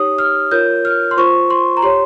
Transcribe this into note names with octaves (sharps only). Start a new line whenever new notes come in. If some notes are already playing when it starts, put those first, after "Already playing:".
Already playing: D#4 G4 C#5 D#6
F6
F4 A#4 C#5 G6
F6
C6
F4 C5 C#6
C6
A#5
G4 C#5 C6